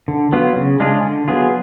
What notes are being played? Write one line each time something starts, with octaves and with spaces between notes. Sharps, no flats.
D3
F#3 B3 F4
C#3
G#3 D4 F4 G#4
D3
F#3 B3 F4 G#4